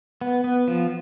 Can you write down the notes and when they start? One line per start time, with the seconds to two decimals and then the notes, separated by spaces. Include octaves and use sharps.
0.21 B3
0.44 B3
0.68 F3